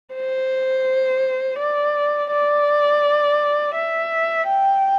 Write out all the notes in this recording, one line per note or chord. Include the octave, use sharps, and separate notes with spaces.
C5
D5
D5
E5
G5